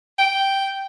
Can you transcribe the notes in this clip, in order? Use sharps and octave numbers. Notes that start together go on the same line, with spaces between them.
G5